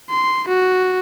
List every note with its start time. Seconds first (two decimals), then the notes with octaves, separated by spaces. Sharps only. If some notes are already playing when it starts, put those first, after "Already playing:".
0.10 C6
0.48 F#4